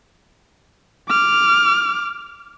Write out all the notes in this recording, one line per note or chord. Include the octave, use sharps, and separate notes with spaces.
D6 F6